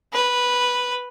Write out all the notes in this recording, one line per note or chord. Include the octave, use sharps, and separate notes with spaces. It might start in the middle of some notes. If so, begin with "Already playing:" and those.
B4